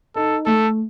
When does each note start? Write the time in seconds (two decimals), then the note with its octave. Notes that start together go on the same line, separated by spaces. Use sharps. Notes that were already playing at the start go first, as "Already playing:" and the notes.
0.15 D#4 A4
0.46 A3 A4